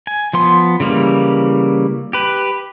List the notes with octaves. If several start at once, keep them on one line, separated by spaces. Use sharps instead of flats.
G#5
F3 B3 C6
C#3 E3 G3 A#3
G4 B4